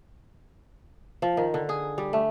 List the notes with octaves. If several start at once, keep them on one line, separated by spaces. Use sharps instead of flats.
F3
D#3
D3
G#4
G3
A3